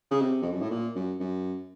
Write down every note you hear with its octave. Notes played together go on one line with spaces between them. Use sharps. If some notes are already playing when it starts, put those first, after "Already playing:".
C#3
C3
F2
F#2
A2
A#2
F#2
F#2